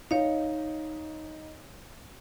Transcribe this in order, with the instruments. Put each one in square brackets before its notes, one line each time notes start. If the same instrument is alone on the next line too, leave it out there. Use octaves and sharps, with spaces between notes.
[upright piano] D#4 [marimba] C#5 D#5 F5